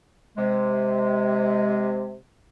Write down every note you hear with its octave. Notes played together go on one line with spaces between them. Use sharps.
C3 G#3